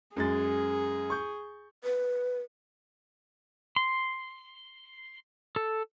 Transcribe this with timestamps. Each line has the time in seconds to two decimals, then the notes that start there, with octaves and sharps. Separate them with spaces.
0.17 F#2 G#3 G#4 A6
1.10 C#6 G6
1.83 B4
3.76 C6
5.56 A4